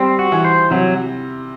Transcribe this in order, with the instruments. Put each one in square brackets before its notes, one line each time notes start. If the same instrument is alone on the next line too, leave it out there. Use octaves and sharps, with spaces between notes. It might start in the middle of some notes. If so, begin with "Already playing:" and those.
Already playing: [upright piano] G3 [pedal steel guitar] C4
[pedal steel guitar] F#4
[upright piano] E3
[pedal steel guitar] C5
[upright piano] C3 [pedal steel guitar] F#3